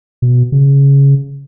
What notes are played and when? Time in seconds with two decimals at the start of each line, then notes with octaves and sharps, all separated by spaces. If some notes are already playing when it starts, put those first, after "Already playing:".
0.22 B2
0.52 C#3